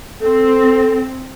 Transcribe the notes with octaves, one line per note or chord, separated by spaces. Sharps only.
C4 A4